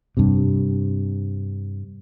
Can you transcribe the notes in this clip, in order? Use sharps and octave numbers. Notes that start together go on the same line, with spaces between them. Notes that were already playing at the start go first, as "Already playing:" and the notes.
G2 C3